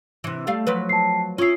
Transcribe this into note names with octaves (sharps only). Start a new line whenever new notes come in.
C3 E3
G3 A3 F5
F3 F#3 B4
A5 C7
C#4 E4 F4 D#6 C7